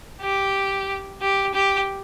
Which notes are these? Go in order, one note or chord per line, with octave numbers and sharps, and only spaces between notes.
G4
G4
G4